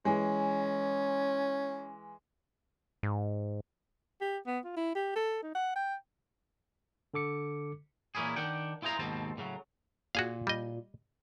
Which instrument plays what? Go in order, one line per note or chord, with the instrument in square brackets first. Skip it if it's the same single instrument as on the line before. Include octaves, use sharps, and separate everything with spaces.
[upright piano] E3 G#3 [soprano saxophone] C#4
[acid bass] G#2
[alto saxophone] G4
B3
F4
E4
G4
A4
D#4
F#5
G5
[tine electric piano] D3 A4 D6 C#7
[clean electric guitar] A#2 E3 A#3 C#4 E4 G#4
D#3 D4 F#5 G5
E4 F4 G#4 C5 A#5
D#2 G#2 B2 C4 A5
A2 C#3 E3 F#3
[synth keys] A#2 [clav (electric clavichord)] F#4 G#4 F5
[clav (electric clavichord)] G3 D#5